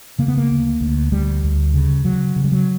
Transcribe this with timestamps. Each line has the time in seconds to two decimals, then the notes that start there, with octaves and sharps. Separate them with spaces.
0.19 C#3 A#3
0.28 B3
0.37 A#3
0.50 D2
0.81 D2
1.12 D2 G3
1.43 D2
1.74 C#3
2.05 C#3 F#3
2.36 C#3
2.44 G3
2.52 F#3